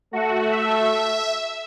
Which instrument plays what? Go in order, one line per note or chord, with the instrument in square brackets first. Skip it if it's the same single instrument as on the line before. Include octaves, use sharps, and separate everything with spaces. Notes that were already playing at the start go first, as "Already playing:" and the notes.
[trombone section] A3 [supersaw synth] F#4
[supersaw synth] E5